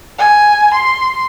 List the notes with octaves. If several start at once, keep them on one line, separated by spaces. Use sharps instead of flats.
G#5
C6